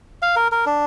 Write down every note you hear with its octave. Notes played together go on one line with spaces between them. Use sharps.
F5
A#4
A#4
D4